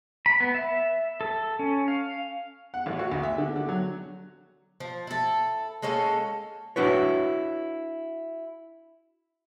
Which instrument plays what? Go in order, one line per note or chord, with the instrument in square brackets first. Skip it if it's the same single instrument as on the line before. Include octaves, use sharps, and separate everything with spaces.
[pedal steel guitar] B5
B3
E5
A4
C#4
F5
[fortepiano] F#5
A1
F#4
D2
E5
D3
D3
F#3
[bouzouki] F3
E4 A4
G#3 A#3 C#4 A4
[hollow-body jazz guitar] D4 E4 F#4 B4 C#5